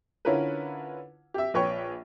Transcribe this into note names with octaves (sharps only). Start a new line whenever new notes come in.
D3 C#4 E4 F4 A#4 B4
G4 E5
A#1 B4 C#5 G5 C#6